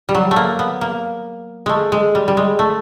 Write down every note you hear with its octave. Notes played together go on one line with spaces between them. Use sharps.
G3
F#3
A3
A#3
B3
A#3
G#3 A3
G#3
G3
G3
G#3
A3